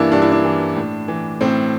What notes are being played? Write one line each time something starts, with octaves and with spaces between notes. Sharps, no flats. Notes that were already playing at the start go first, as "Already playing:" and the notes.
Already playing: G2 E3 A#3 D4 E4
G2 D4
E4
D4
E3
A2
E3
A2 C4